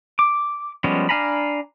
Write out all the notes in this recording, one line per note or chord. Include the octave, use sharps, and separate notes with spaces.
D6
F3 G3 G#3 B3 C#4
D4 F5 G#5 A#5 B5